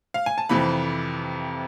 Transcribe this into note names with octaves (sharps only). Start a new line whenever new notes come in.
F5
G#5
A5
F2 C3 E3 B5